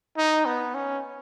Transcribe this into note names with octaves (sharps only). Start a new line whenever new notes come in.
D#4
B3
C#4